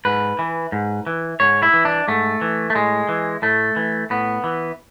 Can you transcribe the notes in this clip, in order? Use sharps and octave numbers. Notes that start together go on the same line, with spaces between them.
G#2 B4
E3
G#2
E3
G#2 C#5
E4
E3
D4
G#2 A3
E3
A3
A2 G#3
E3
A2 A3
E3
A2 B3
E3